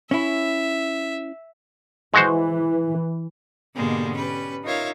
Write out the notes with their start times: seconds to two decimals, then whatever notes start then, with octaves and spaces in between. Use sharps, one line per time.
0.11 C#4 E4 E5
2.14 E3 G#3 F#4 C5
3.75 G#2 B2 D3 G3 G#3 A#3
4.15 G3 C#4 B4
4.64 D#4 F4 A#4 C#5 E5 F5